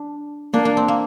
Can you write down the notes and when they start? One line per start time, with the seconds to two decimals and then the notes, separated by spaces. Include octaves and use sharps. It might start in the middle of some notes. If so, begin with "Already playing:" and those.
Already playing: D4
0.53 A#3 D4
0.65 D4
0.77 C4
0.88 A#3